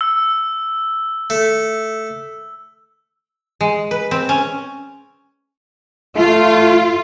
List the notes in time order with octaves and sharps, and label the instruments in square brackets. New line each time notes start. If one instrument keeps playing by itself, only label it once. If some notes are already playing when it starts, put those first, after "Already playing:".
[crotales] E6
[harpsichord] A3
[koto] G#3
B4
C4
C#4
[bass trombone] A3 [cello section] F4